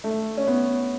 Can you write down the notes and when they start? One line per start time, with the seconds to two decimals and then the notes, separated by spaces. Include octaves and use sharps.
0.04 A3
0.37 C#4
0.48 B3